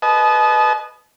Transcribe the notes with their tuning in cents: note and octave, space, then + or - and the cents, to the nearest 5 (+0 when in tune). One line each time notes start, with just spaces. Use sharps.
B4 +0 D#5 -5 A5 -40